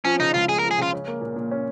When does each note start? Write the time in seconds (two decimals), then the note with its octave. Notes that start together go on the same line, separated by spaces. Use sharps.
0.05 F3 C#4
0.20 C#3 D#4
0.34 C#2 F4
0.49 G#3 G#4
0.59 A#4
0.64 F3
0.71 G#4
0.78 C#3 F4
0.93 C#4
1.07 A#3
1.21 A#2
1.36 A#2
1.51 C#4